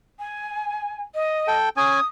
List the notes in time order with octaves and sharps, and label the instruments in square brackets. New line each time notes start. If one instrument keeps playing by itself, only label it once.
[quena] G#5
D#5
[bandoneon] A4 G5
[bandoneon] C#4 G#5 [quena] D#6